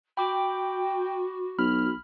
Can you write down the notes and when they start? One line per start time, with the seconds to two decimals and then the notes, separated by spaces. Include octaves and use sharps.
0.17 F#4 G5 B5 D6
1.59 B1 B5 F6